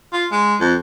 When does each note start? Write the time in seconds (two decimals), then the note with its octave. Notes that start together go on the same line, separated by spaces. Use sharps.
0.13 F4
0.32 G#3
0.60 F2